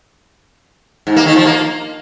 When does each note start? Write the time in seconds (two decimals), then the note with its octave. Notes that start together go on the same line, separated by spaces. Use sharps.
1.07 G#2
1.16 A#3
1.26 D#3
1.36 F3
1.46 A#3